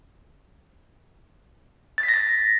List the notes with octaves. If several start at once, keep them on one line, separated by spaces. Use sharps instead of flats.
A6
B6
A#6
A6